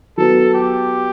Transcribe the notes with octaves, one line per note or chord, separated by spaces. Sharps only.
F#3 B3 F#4 A4
G4